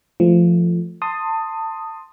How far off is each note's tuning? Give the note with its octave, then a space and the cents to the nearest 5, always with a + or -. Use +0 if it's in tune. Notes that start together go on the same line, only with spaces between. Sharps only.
F3 -15 A3 +0
A5 +25 C6 +5 D#6 +0